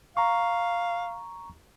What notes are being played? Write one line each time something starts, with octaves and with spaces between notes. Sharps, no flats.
F5 A#5 C#6